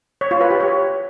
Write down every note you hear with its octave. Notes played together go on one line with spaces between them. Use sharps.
C#5
F4
B4
G4
C#5